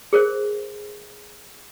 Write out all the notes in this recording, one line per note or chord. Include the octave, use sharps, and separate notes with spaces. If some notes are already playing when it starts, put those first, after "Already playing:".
G#4 A#4 C5